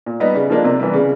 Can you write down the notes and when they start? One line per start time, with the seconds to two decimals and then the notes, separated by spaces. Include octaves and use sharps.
0.06 A#2
0.20 G3 B3 D#4
0.35 C#3
0.50 F3 A#3 D4
0.64 C3
0.80 E3 G3
0.94 C#3